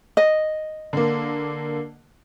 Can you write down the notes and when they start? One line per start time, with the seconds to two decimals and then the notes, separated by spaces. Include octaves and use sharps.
0.17 D#5
0.93 D3 A#3